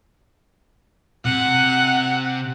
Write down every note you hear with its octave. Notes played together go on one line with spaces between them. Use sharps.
C3 F#5